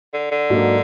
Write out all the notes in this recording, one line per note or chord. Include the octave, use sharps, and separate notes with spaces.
D3
D3
G#2 F#3 A#3 D4